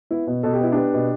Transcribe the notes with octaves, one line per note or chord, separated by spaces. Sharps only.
B3 E4
B2
B2 A4
G4
B3 E4
B3 D4 G4
B2